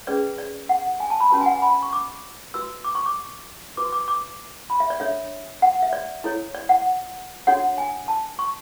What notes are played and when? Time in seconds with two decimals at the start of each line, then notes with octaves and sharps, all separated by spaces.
0.07 C#4 G#4 B4 D5
0.38 D5
0.69 F#5
1.00 G#5
1.10 A5
1.20 B5
1.30 C#4 F#4 B4 A5
1.41 G#5
1.46 F#5
1.52 G#5
1.62 B5
1.83 C#6
1.93 D6
2.54 F#4 B4 E6
2.84 D6
2.95 C#6
3.06 D6
3.77 F#4 B4 D6
3.92 D6
4.08 D6
4.70 B5
4.80 E5
4.90 D5
5.00 D4 A4 C#5 E5
5.62 F#5
5.82 E5
5.93 D5
6.24 E4 A4 C#5
6.55 D5
6.69 F#5
7.47 D4 F#4 A4 C#5 F#5
7.78 G#5
8.08 A5
8.39 C#6